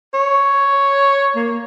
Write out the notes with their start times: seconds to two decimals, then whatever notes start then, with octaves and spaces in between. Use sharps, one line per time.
0.14 C#5
1.36 A#3